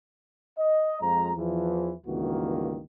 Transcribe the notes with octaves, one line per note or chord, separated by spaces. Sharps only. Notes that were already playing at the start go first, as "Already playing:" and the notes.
D#5
F2 F3 G#3 A#5
E2 E3 F3
C#2 G2 D#3 E3 A#3 F#4